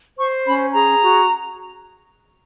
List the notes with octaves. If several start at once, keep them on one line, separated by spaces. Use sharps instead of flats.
C5 C#6
C#4 B5
G#4 A#5
F#4